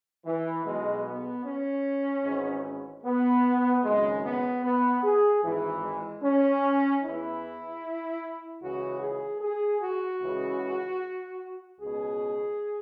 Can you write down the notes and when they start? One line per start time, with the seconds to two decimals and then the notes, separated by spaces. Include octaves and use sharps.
0.26 E3
0.65 B1 B2 G#3
1.05 B3
1.45 C#4
2.24 G#1 G#2 E3
3.04 B3
3.84 G#1 F#2 C#3 G#3
4.24 B3
4.63 B3
5.03 G#4
5.43 G#1 G#2 E3
5.83 G#3
6.22 C#4
7.02 E2 E3 E4
8.61 C#2 C#3 E3 F#4
9.01 G#4
9.41 G#4
9.81 F#4
10.21 C#2 C#3 E3
11.79 C#2 B2 G#4